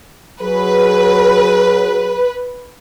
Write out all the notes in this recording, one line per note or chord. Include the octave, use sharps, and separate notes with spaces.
F#3 G#4 B4